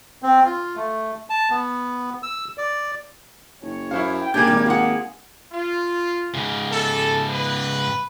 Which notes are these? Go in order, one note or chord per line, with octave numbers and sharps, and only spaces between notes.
C4
F4
A3
A5
B3
E6
D5
F#1 C#5
F#2 E4 C5 F5
G5
C#3 A#3 D4 G4 G#4 G6 G#6
G#1 G3
F4 G#4 F#5
F4
G#2 C#3
A4
B4